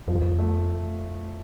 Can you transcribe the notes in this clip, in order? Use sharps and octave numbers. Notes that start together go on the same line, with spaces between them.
F2 F3
E2
F2
A3